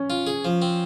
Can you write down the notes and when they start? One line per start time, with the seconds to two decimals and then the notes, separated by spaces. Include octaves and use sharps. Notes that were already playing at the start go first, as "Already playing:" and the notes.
Already playing: C#4
0.10 F4
0.27 G#4
0.45 F3
0.62 C4